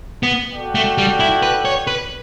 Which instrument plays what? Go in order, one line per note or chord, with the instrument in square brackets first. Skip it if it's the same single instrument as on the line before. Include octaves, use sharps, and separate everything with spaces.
[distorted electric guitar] B3
[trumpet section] F#4 A4 D5 G5
[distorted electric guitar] A3
G3
E4
B4
C#5
B4